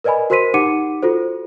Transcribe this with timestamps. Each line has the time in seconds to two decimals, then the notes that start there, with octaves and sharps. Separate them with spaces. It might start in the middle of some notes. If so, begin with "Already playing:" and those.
0.04 A#4 B4 D5 D#5 G#5 B5
0.30 F#4 A#4 C5 C6 B6 D#7
0.54 D#4 G4 F#5 D6 C#7 D#7
1.02 F4 F#4 A4 C5